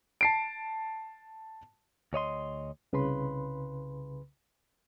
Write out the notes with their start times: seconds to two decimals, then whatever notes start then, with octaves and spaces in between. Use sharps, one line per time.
0.21 A5 C7 D7
2.13 D2 C#5 D#5 C6
2.93 C2 C#3 B4 B5 C6